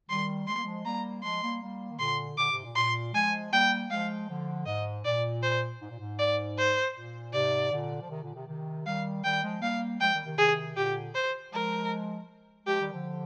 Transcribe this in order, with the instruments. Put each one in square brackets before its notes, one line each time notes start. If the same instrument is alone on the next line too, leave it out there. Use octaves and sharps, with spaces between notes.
[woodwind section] D#3 G3 [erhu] C6
[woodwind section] G#3 [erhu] C6
[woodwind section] A#3
F3 G#3
[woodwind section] G3 A#3 [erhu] A#5
[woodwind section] F3 G#3 [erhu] C6
[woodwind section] G3 A#3
G3 A#3
D#3
[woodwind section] A#2 D3 [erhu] C6
[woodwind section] A#2 D3 [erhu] D6
[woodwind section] G#2 C3
A#2
[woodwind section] A#2 [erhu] C6
[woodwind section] F3 G#3 [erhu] G#5
[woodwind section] G3 A#3 [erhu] G5
[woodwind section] F3 G#3 [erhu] F5
[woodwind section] D3 F3
[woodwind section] G#2 [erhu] D#5
[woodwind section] A#2 [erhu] D5
[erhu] C5
[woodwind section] G#2
A#2
G#2
[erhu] D5
C5
[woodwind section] A#2
[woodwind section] G#2 C3 [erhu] D5
[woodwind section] A#2 D3
F3
C3 D#3
A#2 D3
C3 D#3
C3 D#3
[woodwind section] D#3 G3 [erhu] F5
[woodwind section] D#3 G3 [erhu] G5
[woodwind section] F3 G#3
[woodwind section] G3 A#3 [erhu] F5
[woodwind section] F3 G#3 [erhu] G5
[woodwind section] D#3 G3
C3 D#3
[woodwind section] C3 D#3 [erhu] G#4
[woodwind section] A#2 D3 [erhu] G4
[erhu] C5
[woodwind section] F3 G#3 [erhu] A#4
[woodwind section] F3 G#3 [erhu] G4
[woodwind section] D#3 G3
D3 F3